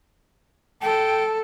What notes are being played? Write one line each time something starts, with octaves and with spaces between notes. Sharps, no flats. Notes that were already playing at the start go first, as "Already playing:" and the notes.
A4 G5